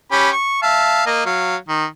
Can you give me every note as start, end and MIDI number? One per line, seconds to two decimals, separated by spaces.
0.12 0.29 61
0.12 0.29 67
0.12 0.29 83
0.33 0.58 85
0.63 1.03 76
0.63 1.03 77
0.63 1.03 81
1.06 1.23 58
1.06 1.23 75
1.26 1.56 54
1.26 1.56 77
1.69 1.85 51